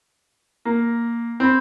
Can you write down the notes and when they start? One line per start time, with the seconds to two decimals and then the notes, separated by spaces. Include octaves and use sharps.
0.65 A#3
1.40 C4 B5